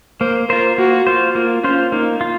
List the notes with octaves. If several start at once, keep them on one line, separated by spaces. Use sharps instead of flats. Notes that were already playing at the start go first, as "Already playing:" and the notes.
A#3 C5
F4 A#4 C5
A#3 F#4
F4 C5
A#3 F4
C#4 F4 C5
A#3 D#4
F4